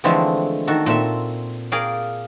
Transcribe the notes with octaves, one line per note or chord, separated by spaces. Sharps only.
D3 E3 F3 G#3 A3 C4
D#3 F#4 A4
A#2 C4 A4 E5
G#4 A#4 D5 F5 G5